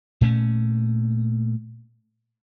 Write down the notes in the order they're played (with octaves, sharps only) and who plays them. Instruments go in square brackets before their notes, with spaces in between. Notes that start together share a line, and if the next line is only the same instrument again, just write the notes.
[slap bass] A#2 A3 C#4